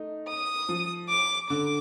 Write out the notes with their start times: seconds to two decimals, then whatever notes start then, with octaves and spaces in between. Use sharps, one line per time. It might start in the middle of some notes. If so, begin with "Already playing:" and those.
Already playing: A3 D#4
0.29 D#6
0.69 F3
1.09 D6
1.50 D3 D6